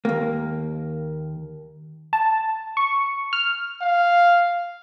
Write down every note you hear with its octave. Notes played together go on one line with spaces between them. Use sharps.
D#2 A#3
A5
C#6
F6
F5